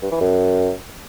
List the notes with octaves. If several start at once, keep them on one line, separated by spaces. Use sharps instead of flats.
G2
E3
F#2